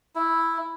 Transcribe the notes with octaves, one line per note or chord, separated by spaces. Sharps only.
E4